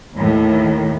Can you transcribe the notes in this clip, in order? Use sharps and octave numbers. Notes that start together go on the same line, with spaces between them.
D#2 A2 D#3